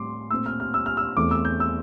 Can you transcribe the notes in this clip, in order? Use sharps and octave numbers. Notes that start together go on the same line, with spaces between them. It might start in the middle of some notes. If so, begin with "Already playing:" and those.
Already playing: A2 G3 C4 C6 D6
A#2 A3 C4 E6
F6
F6
E6
F6
E6
E2 E3 A3 C4 D6
E6
G6
E6